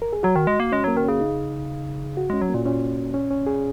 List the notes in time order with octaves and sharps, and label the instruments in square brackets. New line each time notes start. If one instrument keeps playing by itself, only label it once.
[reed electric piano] A#4
G#4
[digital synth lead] F#3 [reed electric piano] F#4
[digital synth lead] D#3
G#3
A#3
[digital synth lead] G#3 [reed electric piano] C#4
[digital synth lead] F#3 [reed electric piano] A#3
[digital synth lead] D#3
[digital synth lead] C#3 [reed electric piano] C#4
[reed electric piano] D#4
F#4
[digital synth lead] G#3 [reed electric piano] C#4
[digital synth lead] F#3
[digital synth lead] A#2 [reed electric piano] A#3
[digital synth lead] A#2 [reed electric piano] C#4
[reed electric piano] C#4
C#4
G#4